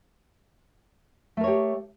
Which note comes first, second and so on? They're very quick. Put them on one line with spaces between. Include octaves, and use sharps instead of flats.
A3 A#4 C#5 G4